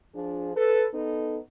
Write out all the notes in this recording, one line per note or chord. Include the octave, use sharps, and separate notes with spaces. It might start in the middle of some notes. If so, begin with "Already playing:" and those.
F3 D4 F4 G#4
A4 B4
B3 D#4 A4